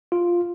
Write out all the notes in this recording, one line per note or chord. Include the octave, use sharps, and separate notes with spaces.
F4